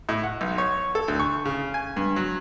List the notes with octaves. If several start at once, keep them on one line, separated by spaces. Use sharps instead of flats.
A2
F#5
B1
C#5
A4
D2
C#6
C#3
G#5
G2
F#3